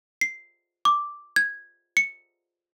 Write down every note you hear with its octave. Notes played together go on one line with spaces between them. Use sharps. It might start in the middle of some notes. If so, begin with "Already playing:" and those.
C7
D6
G#6
C#7